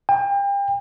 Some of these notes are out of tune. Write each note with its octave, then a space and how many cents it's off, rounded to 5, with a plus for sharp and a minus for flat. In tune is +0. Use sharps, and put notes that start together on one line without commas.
G5 +35